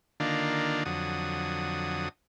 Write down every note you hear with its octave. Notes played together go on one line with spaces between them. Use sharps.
D3 D#3 A#3 D4 F4
F2 D3 F#3 D#6